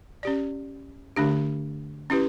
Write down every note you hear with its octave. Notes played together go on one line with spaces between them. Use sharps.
C#4 G4 D5
D3 A3 D4 G4
C#4 E4 G4 B4